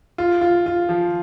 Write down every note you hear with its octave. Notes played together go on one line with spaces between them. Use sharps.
F4
F4
F4
F3